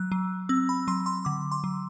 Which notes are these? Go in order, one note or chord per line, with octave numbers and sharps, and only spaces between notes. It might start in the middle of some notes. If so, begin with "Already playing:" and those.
Already playing: F#3 F#6
F#3
C4 E6
B5
F#3 C6
C6
D3 D6
C6
F#3